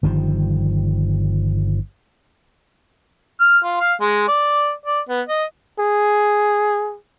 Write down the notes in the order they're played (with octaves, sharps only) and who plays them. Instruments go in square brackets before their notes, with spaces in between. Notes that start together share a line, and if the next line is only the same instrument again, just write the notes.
[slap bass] G1 D#3 F3 G3
[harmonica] F6
F4
F5
G#3
D5
D5
B3
D#5
[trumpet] G#4